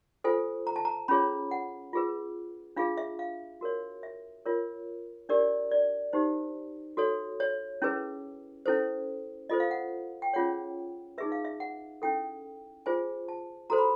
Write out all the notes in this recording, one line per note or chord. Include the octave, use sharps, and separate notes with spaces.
F4 A4 C5 G#5
A#5
A5
A#5
C#4 F4 G#4 C#5 B5
F#5
F4 G#4 B4
D4 F4 G#4 F5
E5
F5
F#4 A#4 C#5
E5
F4 A#4 C#5
D4 G4 A#4 C#5 D5
D5
D#4 G4 C5
F#4 A4 C#5
C#5
C#4 E4 G#4 B4
C#4 E4 A4 C5
F4 A4 C5 D#5
F5
F#5
G5
C#4 F4 G#4 C#5 F#5
D#4 G#4 B4 E5
F5
E5
F#5
C#4 E4 A4 G5
F4 G#4 C5 G#5
A5
F#4 A4 C5 A#5
B5